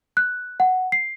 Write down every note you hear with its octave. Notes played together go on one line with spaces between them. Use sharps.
F#6
F#5
C7